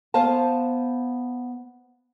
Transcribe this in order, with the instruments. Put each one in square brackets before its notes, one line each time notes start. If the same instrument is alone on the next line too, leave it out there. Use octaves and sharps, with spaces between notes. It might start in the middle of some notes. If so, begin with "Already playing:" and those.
[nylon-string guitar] B3 C5 F5 A5